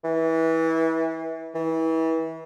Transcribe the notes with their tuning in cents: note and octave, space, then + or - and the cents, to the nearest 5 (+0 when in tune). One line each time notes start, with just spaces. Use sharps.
E3 -25
E3 -30